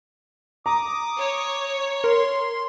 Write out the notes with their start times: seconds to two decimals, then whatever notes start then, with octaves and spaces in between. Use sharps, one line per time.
0.66 A#5 D6 D#6
1.20 C#5
2.04 A#4 C6